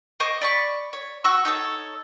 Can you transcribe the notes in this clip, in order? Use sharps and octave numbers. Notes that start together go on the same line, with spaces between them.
C5 D#5 C#6 D6
D5 B5 C#6
C#5
F#4 C#6 E6
D#4 A4 C#5